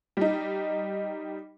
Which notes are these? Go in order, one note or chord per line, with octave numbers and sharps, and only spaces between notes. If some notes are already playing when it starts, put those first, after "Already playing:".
G3 D#4